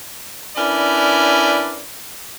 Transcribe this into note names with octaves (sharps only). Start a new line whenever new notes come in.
C#4 D4 E4 A#4 B4 D5